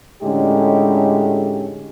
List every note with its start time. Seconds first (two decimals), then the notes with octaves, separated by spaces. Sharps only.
0.23 A2 D3 G#3 C#4 D#4 G4